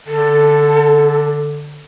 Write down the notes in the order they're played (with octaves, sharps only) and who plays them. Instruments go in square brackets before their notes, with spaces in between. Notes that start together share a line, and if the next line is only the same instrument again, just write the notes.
[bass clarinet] D3 [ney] A4